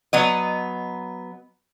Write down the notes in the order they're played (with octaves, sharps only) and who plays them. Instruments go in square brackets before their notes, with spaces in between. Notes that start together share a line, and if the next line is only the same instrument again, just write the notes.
[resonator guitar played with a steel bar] F#3 B3 D#5